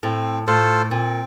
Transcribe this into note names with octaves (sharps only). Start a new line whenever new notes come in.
A2 C4
A2 F4 A4 C5
A#2 C4